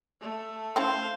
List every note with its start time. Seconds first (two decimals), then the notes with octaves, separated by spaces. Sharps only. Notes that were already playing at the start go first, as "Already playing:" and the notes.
0.21 A3
0.76 C4 C#4 E4 C5 F5